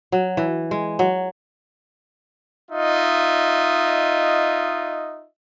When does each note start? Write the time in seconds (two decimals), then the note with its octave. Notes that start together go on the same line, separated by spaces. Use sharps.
0.12 F#3
0.37 E3
0.71 G#3
0.99 F#3
2.71 D#4 F4 D#5 E5